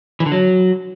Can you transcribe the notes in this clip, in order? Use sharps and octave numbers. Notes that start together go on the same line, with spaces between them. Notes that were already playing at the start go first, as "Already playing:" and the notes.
E3
D3
F#3